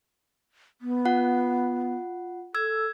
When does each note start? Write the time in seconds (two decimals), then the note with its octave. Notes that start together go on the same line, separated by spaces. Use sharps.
0.81 B3
1.05 F4 F#5
2.55 A4 E6 G#6